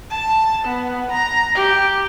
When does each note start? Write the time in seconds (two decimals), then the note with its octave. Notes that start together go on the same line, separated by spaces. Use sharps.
0.10 A5
0.65 B3
1.11 A#5
1.55 G4